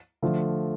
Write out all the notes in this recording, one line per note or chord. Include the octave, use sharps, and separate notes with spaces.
D3 F3 A3